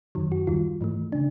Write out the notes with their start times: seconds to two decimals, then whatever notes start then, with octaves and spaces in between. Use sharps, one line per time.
0.15 F#2 D#3 F#3
0.32 F#4
0.47 D#2 D#3 G3 F4
0.81 G#2 E3 A3
1.12 C#3 D4